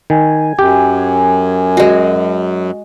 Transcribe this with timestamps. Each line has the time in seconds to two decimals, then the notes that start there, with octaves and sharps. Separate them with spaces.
0.10 D#3 G#5
0.59 F#2 G4
1.77 G#3 F#4